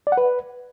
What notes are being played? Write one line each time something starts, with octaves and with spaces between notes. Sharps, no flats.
D5
F#5
B4